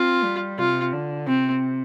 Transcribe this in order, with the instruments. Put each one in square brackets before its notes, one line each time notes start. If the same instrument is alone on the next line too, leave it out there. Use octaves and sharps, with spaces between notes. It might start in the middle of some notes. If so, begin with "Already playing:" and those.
Already playing: [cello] C4 [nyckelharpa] F4
[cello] G3
[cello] C3 [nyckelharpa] F4
[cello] D3
[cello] C3 [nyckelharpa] C4